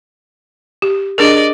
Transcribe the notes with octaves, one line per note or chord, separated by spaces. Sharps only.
G4
D4 G#4 A#4 D5 D#5